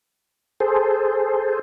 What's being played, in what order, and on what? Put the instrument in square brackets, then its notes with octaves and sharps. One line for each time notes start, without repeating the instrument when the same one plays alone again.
[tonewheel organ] G#4 A4 C5